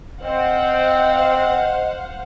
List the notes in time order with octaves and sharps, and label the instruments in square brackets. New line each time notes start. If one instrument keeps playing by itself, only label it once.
[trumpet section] C4 [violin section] C5 F5 F#5 [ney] D#5